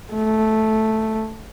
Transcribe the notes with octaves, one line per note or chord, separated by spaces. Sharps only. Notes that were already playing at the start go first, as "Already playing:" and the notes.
A3